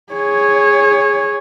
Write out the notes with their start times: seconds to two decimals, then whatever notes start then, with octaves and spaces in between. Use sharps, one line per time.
0.13 G#4 C#5